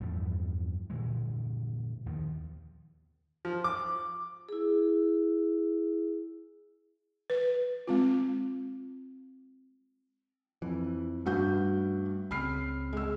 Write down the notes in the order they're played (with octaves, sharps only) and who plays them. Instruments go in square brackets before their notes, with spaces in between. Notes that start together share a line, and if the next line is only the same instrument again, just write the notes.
[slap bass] E2 G2 F3 G3
A#2 D3 E3 G#3
D#2 D#3 F3
[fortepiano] F3
D6
[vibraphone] E4 G#4
[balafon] B4
G#3 C4 F4
[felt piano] F2 [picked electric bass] E3
[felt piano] G2 F#4 G6 [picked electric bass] G3 A3 C#4
[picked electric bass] C#2 C#3 C4 [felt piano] B5 F6 C7
[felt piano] G#3 E6